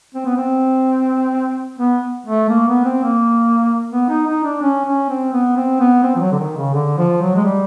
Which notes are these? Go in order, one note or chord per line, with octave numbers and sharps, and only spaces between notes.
C4
B3
C4
B3
A3
A#3
B3
C4
A#3
B3
D#4
D#4
D4
C#4
C#4
C4
B3
C4
B3
C4
F3
F#3
D3
D#3
C#3
D3
F3
F#3
G#3
G3